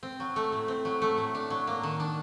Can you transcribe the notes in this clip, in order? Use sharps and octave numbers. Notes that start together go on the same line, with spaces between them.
C4
F#3
A3
A2
C4
F#3
A3
A2
D4
F#3
A#3
D#3
D4